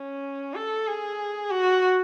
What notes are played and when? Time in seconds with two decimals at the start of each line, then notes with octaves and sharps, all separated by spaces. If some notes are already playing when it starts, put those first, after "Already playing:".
Already playing: C#4
0.55 A4
0.87 G#4
1.51 F#4